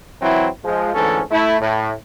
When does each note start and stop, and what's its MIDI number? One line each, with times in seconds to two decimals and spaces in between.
0.22 0.48 52
0.22 0.48 54
0.22 0.48 60
0.22 0.48 64
0.64 0.94 53
0.64 0.94 56
0.94 1.21 38
0.94 1.21 44
0.94 1.21 52
0.94 1.21 61
0.94 1.21 69
1.31 1.56 57
1.31 1.56 64
1.61 1.92 45